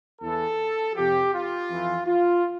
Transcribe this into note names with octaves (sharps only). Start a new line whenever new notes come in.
E2 E3 A4
F2 C3 F3 G4
F4
F2 E3
F4